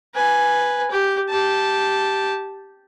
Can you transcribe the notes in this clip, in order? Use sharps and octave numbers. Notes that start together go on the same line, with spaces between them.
B4 G#5
G4
G4 A5